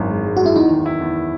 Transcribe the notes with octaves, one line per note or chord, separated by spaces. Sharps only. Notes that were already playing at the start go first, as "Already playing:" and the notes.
Already playing: G#1 F#2 E3
G#3
G#3
G#3 F#4
E4
E2 D#4
D#3
E4
E2